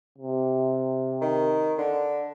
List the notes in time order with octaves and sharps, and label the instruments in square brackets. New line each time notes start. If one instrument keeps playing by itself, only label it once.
[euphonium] C3
[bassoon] D#3
D3